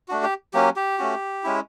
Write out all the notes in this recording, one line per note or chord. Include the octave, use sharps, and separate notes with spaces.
A3 D4 F#4
G4
F#3 A#3 C#4 G4
G4
A3 C#4 F#4
G#3 C#4 E4